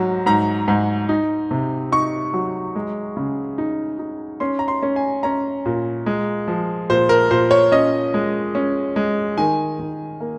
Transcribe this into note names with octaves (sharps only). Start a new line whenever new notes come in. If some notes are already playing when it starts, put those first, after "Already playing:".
Already playing: G#2 F#3
G#2 A#5
G#2
D#4
C3
D#4 C#6
F#3
G#3
C#3
D#4
D#4
C#4 C6
A#5
C6
C#4
G#5
C#4 A#5
A#2
G#3
F3
A#2 C5
A#4
A#2 C5
C#5
C#4 D#5
G#3
C#4
G#3
D#3 G#5
D#3
A#3